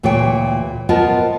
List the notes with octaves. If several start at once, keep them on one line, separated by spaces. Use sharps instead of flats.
D2 A#2 E3 G#4 C#5 G5
B3 F4 A#4 C5 D#5 A5